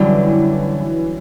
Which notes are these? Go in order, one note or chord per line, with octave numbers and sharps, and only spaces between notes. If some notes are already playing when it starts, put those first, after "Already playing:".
Already playing: F#2 D3 E3 G3